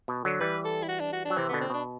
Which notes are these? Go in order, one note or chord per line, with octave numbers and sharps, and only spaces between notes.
B2
D3 F#3
E3 G3 B4
A4
E4
F#4
D4
F#4
D4
F#3
C3 E3 C4
B3
B2 D3
C4
B2 D4